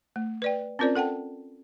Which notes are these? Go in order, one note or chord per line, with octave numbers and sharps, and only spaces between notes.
A3
B4 D5 G5
C4 C#4 F4 A#4 C5 D5
A4 F#5 G5 A5